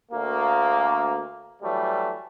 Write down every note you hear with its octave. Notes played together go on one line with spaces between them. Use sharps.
D2 A#3
E3 F#3 G3 A3